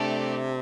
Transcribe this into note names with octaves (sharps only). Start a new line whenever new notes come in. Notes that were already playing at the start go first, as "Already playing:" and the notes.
Already playing: C3 A3 D4 G4 D5